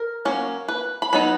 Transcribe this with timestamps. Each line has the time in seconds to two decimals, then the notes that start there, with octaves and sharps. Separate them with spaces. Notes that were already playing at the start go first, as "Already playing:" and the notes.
Already playing: A#4
0.25 F#3 A#3 C#4
0.68 B4
1.02 B5
1.13 F#3 B3 D#4 B5